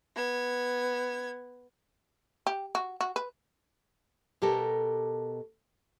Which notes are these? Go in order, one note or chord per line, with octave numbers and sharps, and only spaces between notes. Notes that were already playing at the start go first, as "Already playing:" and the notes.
B3 G#6
G4
F#4
F#4
B4
B2 G4 A4 A#4